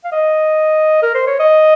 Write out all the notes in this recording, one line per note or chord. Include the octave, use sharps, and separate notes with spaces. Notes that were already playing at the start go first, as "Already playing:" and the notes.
F5
D#5
A#4
C5
C#5
D#5